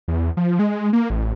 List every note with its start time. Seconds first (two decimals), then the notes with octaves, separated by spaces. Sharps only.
0.08 E2
0.37 F3
0.59 G#3
0.93 A#3
1.10 A1